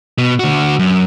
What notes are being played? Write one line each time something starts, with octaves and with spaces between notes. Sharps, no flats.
B2
D3 F#4
F#2